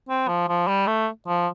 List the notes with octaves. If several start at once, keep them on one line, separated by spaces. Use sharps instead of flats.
C4
F3
F3
G3
A3
F3